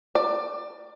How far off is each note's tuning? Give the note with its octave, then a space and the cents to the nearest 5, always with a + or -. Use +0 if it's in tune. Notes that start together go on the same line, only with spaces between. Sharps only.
D5 +20